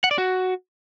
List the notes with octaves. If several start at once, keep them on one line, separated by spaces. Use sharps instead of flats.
F#5
D5
F#4